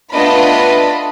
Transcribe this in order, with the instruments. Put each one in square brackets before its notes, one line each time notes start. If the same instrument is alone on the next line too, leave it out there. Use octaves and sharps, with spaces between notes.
[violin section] A3 B3 D4 F4 D#5 B5